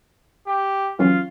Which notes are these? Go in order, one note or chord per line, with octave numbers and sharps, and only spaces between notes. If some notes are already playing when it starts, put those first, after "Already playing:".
G4
E3 F#3 C#4 F4